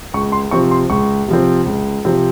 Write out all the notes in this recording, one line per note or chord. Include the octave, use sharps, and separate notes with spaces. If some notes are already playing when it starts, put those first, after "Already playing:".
C#2 C#6
C6
C3 F3 C4 C#6
C6
C#2 C#6
C3 F3 C4
C#2
C3 F3 C4